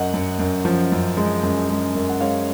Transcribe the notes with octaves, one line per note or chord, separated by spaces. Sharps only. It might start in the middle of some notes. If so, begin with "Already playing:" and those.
Already playing: F#2 D#5 F#5
F#2
F#2
F3
F#2
G#3
F#2
G#3
F#2
F#5
G#3 C#5 F5